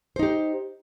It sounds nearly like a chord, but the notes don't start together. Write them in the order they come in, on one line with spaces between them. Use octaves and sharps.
C5 D#4 G4